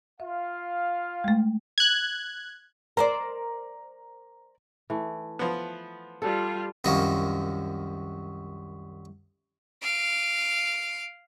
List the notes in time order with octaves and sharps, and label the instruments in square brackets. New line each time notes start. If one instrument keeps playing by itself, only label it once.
[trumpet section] F4 F5 [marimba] E5
[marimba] G#3 A3
[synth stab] F#6 G#6
[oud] A#4 C5 D5 [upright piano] A#5
[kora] E3 A3
[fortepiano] F3 B3
[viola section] G3 F4 [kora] A4
[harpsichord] C2 F#2 D#3 F3 F#3
[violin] F5 D7